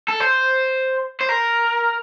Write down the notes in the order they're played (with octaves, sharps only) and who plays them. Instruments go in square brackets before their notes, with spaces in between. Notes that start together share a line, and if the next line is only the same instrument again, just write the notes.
[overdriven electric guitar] A4
C5
C5
A#4